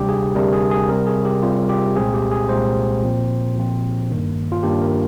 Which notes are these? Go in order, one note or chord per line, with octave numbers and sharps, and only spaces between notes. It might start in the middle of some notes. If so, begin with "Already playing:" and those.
Already playing: D2 C3 G3 D4 G4
G#4
D2 C3 G3 D4 A#4
G#4
G#4
C3 G3 C4 A#4
G#4
G4
C3 G3 C4 F4
G4
C2 A#2 G#3 C4 G#4
G4
G#4
C2 A#2 G#3 C4 C5
A#2 F3 C4
A#2 F3 C4
G2 D#3 A#3 D4
F4
G2 D#3 A#3 D4 G4
A#4